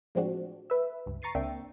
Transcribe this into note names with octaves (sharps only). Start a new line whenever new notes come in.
A2 F3 G#3 C4 D4 F#4
B4 E5
C#2 G2
A#5 C#6 A6 C7 D#7
C#2 A#3 C4 D4 E5 G5